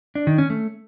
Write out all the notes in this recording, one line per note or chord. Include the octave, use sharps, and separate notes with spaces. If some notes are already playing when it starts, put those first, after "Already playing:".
D4
D#3
C#4
A3